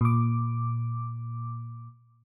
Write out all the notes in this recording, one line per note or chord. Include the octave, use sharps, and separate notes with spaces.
A#2 D6